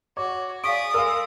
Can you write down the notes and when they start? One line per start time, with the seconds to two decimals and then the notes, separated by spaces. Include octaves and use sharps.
0.17 F#4 C#5 D6
0.64 G#4 D5 F5 C#6 D#6 B6 D7
0.94 G#3 A#4 F5 E6